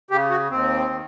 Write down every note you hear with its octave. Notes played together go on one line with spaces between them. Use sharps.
C#3 G4
F#4
D#2 C4
D#3